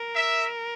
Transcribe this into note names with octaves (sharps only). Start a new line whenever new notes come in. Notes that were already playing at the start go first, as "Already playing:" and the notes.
Already playing: A#4
E5